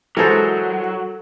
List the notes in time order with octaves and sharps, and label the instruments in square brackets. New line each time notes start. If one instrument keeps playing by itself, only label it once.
[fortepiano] E3 G#3 C5 [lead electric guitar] F#3 [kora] A4 A#4